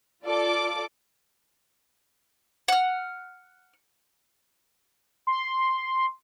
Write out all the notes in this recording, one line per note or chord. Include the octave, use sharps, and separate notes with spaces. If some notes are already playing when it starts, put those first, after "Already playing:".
F4 A4 D5 D6
F#5 F6
C6